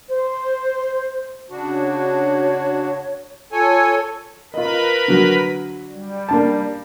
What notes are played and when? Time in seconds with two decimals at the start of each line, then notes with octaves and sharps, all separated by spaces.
0.09 C5
1.50 C#3 D4 F#4
1.70 C#5
3.52 F4 A4 C#5 G#5
4.54 F4 A#4 B4 D#5 B5
5.08 D3 F#3
5.87 G3
6.29 A#3 D4 A5